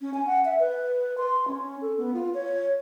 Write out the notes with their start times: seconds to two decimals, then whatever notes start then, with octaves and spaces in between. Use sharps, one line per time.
0.01 C#4
0.14 G#5
0.27 F#5
0.45 E5
0.60 B4
1.18 C6
1.48 C#4
1.82 A4
1.98 B3
2.14 F4
2.34 C#5